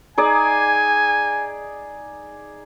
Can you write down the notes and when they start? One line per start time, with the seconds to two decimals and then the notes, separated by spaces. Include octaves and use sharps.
0.17 D#4 G#4 D5 G#5